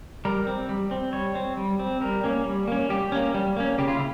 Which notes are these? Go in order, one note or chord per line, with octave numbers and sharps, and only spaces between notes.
G3 A#4
C4
G3
C4
G3 C#5
C4
G3
C4
G3 A#4
A#3 C#4
G3
A#3 C#4
G3 G4
A#3 C#4
G3
A#3 C#4
C#3 G4
F4
E4